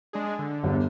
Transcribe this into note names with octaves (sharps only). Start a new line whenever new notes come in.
G#3 D4 G#4
D3
G1 E2